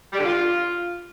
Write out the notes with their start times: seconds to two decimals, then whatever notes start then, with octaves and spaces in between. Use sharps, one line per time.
0.13 G3
0.19 D3
0.24 F4